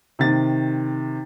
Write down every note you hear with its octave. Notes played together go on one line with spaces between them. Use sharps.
C3 D#3 A6